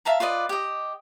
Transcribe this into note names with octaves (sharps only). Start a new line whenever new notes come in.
E5 F5 A5 A#5
F4 B4 D5 D#5
G4 D#5